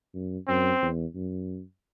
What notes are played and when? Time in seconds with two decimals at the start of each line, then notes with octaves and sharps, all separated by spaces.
0.14 F#2
0.48 F#2 C4
0.82 E2
1.15 F#2